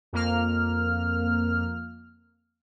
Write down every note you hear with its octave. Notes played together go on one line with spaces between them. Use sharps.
F2 A#3 F6